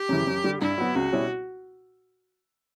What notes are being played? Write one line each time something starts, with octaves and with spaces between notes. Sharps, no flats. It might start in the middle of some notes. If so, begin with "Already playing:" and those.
Already playing: G4
F#2 C#3 E3
F#2
D3 G3
G2 E4
F#3 B3 F#4
C#2 F#4
B2 G3 C#4 E4